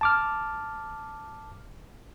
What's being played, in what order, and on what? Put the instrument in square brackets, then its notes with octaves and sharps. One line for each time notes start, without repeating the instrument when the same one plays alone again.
[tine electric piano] A5 D6 F6